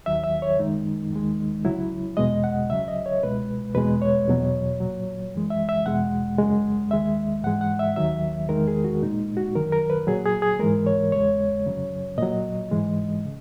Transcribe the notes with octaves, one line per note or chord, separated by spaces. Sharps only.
D#2 D#3 F#3 E5
E5
C#5
F#2 D#3 G#3 D#4
D#2 D#3 G#3
C#2 C#3 F#3 E4
E2 B2 G#3 D#5
F#5
C#2 C#3 F#3 E5
D#5
C#5
C#2 B2 G#3 B4
E2 B2 G#3 B4
C#5
E2 B2 F#3
A#2 F#3
F#2 E3 G#3
E5
E5
E2 B2 G#3 F#5
F#2 C#3 G#3
D#2 D#3 G#3 E5
G#2 E3 G#3 F#5
F#5
E5
D#2 D#3 F#3 E5
E2 D#3 G#3 A#4
G#4
F#4
A#2 G#3 D#4
F#4
F#2 D#3 F#3 A#4
A#4
B4
A#2 F#3 G#4
G#4
G#4
G#2 E3 G#3 A#4
C#5
E2 C#3 G#3 C#5
F#2 C#3 F#3
A#2 F#3 D#5
G#2 E3 G#3
C#3